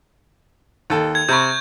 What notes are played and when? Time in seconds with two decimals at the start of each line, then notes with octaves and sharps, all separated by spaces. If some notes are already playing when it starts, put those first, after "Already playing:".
0.90 D#2 A4
1.15 G#6
1.29 C3 B5 C#6 G6